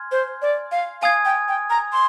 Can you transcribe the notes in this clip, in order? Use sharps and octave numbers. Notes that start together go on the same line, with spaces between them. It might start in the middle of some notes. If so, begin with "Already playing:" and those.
Already playing: G#5 C6 F6 G#6
C5
D5
F5
F5 G#5 D#6 G#6
G5
G5
A#5
C6